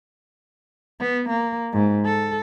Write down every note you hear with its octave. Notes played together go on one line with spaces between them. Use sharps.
B3
A#3
G#2
A4